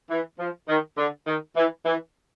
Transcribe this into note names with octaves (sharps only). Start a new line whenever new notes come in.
E3
F3
D#3
D3
D#3
E3
E3